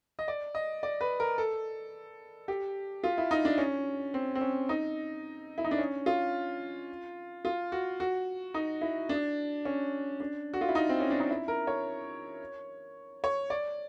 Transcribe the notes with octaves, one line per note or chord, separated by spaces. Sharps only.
D#5
D5
D#5
D5
B4
A#4
A4
G4
F4
E4
D#4
D4
C#4
C4
C4
C#4
D#4
E4
D#4
D4
C#4
F4
F4
F#4
F#4
D#4
E4
D4
C#4
D4
F#4
F4
E4
D#4
C4
C#4
D4
D#4
E4
A#4
C#5
C#5
D5